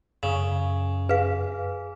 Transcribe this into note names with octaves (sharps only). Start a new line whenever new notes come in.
F#2 C#3
G#4 B4 F5